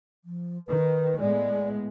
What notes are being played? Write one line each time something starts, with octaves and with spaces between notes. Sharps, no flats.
F3
D#3 B4
A2 G#3 B3 D5